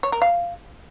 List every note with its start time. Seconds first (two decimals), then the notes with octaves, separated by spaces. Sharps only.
0.03 C#5
0.12 A#4
0.22 F5